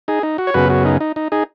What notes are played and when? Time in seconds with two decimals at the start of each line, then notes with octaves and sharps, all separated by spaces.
0.08 D#4 G#4
0.23 D#4
0.38 F#4
0.47 C#5
0.54 F#2 C#3 B3 F#4 B4
0.70 F#4
0.85 D#4
1.01 D#4
1.16 D#4
1.32 D#4 G#4